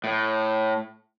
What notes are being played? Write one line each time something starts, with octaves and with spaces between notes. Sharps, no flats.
A2